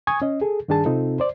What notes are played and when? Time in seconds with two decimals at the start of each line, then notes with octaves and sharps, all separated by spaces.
0.07 G#5 C#6 D#6 G#6
0.22 C#4 D#5
0.41 G#4 A4
0.68 G2 D#3 D4 G#4 A5
0.85 C3 C4 D#4 F4 A4
1.20 C5 D5